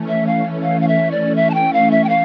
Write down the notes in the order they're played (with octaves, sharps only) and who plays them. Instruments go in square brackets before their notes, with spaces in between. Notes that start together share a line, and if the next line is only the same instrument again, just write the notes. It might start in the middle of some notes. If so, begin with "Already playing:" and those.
Already playing: [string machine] E3 A3 C#4
[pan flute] E5
F5
F5
F5
E5
D5
E5
A5
G5
F5
E5
G5
F5